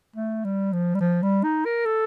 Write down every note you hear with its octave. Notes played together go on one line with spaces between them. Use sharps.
A3
G3
F3
G3
F3
G3
D#4
A#4
A4